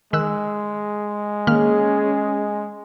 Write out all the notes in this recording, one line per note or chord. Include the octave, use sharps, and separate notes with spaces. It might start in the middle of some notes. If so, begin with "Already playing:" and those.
D#3 G#3 E6 F#6
D#3 A#3 C#4 G#4 F6